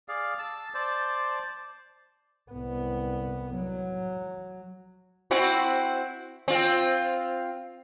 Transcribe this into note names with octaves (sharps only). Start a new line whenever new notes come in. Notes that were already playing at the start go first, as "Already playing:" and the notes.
G#4 D5 F5
A5 E6
C5 D5 A5
C2 B3
F#3
C4 E4 F#4
C4 F4